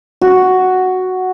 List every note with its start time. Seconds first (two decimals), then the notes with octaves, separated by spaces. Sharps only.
0.21 F#4